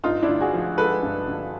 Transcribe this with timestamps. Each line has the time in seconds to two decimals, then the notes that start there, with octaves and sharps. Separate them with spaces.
0.04 G2 D#4 F4
0.22 D4 E4
0.28 D3
0.41 F#4 G#4
0.53 F3
0.77 G#3 A4 B4
1.03 G2
1.28 D3